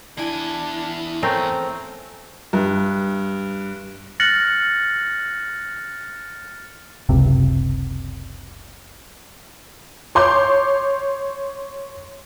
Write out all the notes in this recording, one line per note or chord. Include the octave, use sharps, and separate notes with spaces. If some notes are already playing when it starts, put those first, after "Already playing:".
E2 D4 E4 G#5
A3 C4 C#4 A#4
G2
F6 F#6 A6 A#6 C#7 F#7
F#1 C#2 C3
C#5 C6 D6 G6